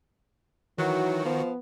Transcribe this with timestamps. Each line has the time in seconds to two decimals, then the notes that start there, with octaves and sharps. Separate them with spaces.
0.78 D#3 E3 F#3 F#4
1.25 F3 B3